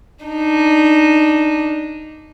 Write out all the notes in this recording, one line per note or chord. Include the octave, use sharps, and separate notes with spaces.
D4 D#4